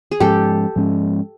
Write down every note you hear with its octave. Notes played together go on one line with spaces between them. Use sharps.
G#4
G#2 F3 G#3 C#4 G4 A4
G#2 F3 G#3 C#4